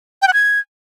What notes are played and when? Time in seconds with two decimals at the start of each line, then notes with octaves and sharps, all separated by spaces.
0.22 G5
0.28 F#5
0.33 G#6